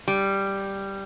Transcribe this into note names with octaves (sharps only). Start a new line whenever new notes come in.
G3